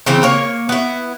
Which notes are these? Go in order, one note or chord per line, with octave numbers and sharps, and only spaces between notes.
C#3 E3 C4
A#3 C#5
B3 E4